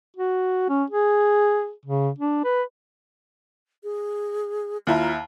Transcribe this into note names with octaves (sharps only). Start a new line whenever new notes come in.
F#4
C#4
G#4
C#3
D4
B4
G#4
D#2 E4 F4 A#5